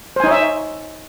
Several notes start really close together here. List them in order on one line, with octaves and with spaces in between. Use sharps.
C5 G#5 D#4 C#5 E5